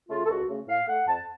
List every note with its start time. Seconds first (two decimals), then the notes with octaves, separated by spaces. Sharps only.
0.09 C#3 A3 F4
0.25 A4
0.29 C#2 F#4
0.49 C#3 A3
0.68 A2 F5
0.88 A3 F#5
1.07 F2 A5